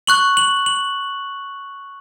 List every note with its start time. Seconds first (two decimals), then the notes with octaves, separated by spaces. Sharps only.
0.07 C#6 F#6 F#7
0.37 F#7
0.66 F#7